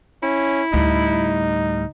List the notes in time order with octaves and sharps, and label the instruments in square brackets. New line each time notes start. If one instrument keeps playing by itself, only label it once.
[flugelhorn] C#4 [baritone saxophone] E4
[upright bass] D2 [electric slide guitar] A2 G3 [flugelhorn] D#4